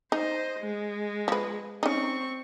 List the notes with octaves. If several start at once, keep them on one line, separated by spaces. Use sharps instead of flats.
D#4 C5 D#5
G#3
F3 B4
C4 C#4 D#4 C#6